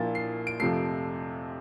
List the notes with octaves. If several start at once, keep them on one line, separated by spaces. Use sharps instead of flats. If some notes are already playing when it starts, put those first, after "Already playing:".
Already playing: A#1 A#2 F3 A#3 E4 A6
C7
D7
F2 C3 F3 A3 C7